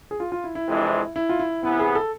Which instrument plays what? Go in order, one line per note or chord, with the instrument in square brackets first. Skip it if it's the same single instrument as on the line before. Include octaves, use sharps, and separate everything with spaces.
[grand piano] G#4
F4
F4
E4
E4
[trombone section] F2 C3 E3 G#3 D4
[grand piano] E4
F4
E4
[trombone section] C3 E3 B3 [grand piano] E4
[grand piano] G#4
A4